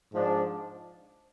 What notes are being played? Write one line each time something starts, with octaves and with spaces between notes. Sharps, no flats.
G#2 F3 G#3 D4